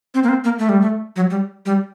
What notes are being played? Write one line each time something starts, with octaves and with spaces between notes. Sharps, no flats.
C4
A#3
C4
A#3
A3
G3
A3
F#3
G3
G3